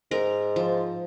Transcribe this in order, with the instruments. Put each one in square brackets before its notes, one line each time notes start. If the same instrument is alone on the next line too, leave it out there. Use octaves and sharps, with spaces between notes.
[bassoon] G#2 [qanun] A#4
[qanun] F3